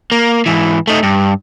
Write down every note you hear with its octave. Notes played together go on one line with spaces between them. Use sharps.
A#3
G#2 E3
A3 D#4
G2